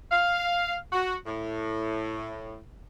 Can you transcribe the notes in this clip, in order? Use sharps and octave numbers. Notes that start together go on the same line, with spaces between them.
F5
F#4
A2